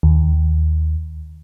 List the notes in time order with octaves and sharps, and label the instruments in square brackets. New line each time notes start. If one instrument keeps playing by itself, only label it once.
[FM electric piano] D#2